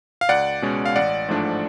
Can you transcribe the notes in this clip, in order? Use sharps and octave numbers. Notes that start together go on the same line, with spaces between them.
F5
C#2 D5 F#5
B2 G#3 C#4
F5
A1 D5 F#5
G#2 F3 A3 D4